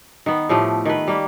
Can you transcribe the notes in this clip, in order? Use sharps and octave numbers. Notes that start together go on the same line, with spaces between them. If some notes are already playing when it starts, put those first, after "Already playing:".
D#3 B3
A2 F3 A3 G4
D#3 B4
G3 A#3